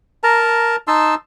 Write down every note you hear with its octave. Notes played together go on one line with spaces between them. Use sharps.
A#4 A5 A#5
D#4 A5 C6 E6